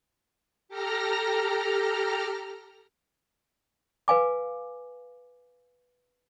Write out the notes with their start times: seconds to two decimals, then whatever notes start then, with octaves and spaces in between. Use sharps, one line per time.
0.69 G4 A4 A#5 F6 A#6
4.08 B4 F5 G#5 D6